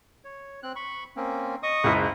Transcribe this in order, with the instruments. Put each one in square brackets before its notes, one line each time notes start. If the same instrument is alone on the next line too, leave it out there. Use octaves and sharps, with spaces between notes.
[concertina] C#5
C4 F#6
B5 C#6
A#3 C4 C#4
D#5 C#6 D#6
[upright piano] F#1 C#2